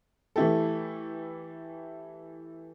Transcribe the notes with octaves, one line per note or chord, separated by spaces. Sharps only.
E3 A3 E4 G4 A4